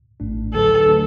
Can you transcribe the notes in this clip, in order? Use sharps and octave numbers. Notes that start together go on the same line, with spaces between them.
A1 A2 A3 D4
D2 D3 F#3 D4 A4 B4
D3 F#3 A3 D4